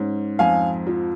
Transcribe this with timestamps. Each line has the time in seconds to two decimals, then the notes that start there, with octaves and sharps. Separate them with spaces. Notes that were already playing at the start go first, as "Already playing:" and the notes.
Already playing: G#2 C#4
0.39 F2 F5 G#5
0.87 F3